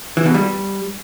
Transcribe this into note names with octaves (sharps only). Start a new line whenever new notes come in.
E3
B2
G3